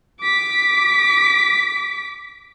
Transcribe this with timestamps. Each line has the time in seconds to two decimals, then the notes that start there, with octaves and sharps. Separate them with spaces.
0.21 D6 B6